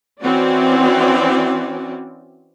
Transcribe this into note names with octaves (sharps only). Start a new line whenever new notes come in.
E3 C4 C#4 F#4 D5